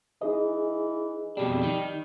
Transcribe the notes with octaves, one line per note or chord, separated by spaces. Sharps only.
E3 D#4 G#4 D#5
F2 B2 G3 D4
D#3